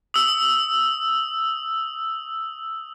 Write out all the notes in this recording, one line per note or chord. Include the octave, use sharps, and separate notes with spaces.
D#6 E6